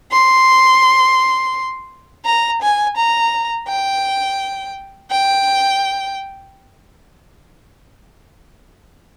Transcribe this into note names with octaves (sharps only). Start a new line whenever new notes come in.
C6
A#5
G#5
A#5
G5
G5